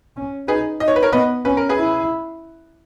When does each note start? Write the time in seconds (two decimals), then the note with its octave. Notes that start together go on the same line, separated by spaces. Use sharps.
0.16 C#4
0.48 D#4 G#4 B4
0.80 D#4 D#5
0.88 C#5
0.96 B4
1.03 A#4 C#5
1.13 B3 B4 D#5
1.45 C#4 B4
1.57 A#4
1.69 G#4 B4
1.78 E4